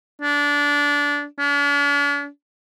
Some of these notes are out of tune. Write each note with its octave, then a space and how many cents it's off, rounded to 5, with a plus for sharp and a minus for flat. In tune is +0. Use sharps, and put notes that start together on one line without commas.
D4 -20
D4 -45